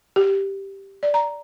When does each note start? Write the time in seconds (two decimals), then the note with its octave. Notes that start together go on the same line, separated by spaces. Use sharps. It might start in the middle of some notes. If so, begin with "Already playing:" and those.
0.16 G4
1.03 D5
1.14 A#5